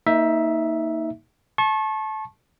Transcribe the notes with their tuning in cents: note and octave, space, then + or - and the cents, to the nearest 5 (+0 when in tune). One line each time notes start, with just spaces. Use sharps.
A#3 -15 D#4 +25 E5 +0
A5 -20 C#6 -35